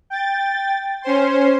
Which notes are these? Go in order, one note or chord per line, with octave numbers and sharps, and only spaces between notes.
G5 A6
C#4 C5 C6